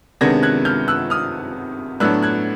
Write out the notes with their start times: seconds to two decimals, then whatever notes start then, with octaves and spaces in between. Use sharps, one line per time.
0.21 C3 D#3 G#3 B3 D4 G#6 A#6
0.43 F#6 G#6
0.65 F6 G6
0.88 E6 F#6
1.10 D#6 F6
2.00 A2 F#3 B3 D4 E6 F#6
2.23 F#6 G#6